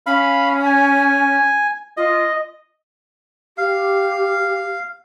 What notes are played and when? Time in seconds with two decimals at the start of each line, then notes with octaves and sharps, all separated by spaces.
0.06 C#4 F5 B5
0.65 G#5
1.97 F4 D#5
3.58 G4 F5